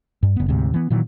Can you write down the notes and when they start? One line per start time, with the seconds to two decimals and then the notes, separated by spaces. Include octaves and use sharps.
0.23 G2
0.36 F#1 B3
0.48 D2 G#2 C3
0.74 E3 B3
0.90 A#2 D#3 E3 F#3